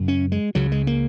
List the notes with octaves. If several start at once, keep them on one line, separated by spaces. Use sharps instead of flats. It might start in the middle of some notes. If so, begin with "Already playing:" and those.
Already playing: F#2 C#3
C#4
G#3
C#2 C#3 F#3
G#3
A#3